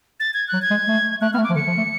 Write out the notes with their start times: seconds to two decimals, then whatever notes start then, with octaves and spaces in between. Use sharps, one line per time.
0.20 A6
0.34 G#6
0.48 F#3 F#6
0.62 G#6
0.71 G#3
0.88 A3
1.21 A3 F#6
1.33 B3 F6
1.38 A3
1.44 D6
1.50 F3
1.55 D3 C#7
1.67 F3
1.78 A3